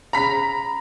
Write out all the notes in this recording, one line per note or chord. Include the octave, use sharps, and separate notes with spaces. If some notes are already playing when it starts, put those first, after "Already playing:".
A#5 B5 B6